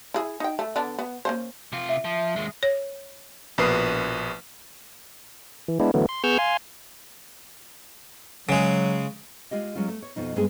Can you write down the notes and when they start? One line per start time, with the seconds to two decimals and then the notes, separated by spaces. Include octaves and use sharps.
0.14 E4 G#4
0.40 D#4 G5
0.59 A3
0.76 D3 B3 D4
0.99 B3
1.25 A#3 C#4 C5
1.72 C3 F4
1.89 E5
2.05 F3
2.36 D#2 G#3
2.63 C#5
3.58 A#1 B2 A#4 B4 D#6 C7
5.68 E3
5.80 G#3 B3 D4 E4
5.94 D3 E3 F#3 A3 B3
6.09 C6
6.24 B3 G#4 C#6 E6 F6 G6
6.38 F5 G#5 C6
8.49 C#3 F#3 G#3
9.51 G#3 F4 G4 D#5
9.75 F#3 G#3 C#4 F4
9.88 A3
10.02 C#5
10.16 F2 B2 F3 D#4
10.36 G2 G#3 B3 C4 D4 G#4